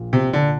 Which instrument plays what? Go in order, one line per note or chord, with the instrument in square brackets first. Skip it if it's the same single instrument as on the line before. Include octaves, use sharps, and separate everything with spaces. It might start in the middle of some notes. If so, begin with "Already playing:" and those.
Already playing: [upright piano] A#1 A#2 F3
[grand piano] C3
D3